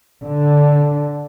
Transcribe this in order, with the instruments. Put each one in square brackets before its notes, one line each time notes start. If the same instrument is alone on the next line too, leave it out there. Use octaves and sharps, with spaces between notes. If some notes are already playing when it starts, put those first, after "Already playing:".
[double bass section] D3